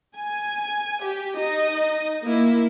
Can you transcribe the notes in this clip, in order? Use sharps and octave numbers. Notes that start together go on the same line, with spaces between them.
G#5
G4
D#4 D#5
A#3 E4